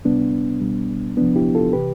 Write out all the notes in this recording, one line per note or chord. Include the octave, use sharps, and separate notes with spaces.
D2 C3 G3 B3 D4
C2 B2 G3
D2 C3 F3 B3 D4
E4 G4
F4 A4
C3 E3 G4 B4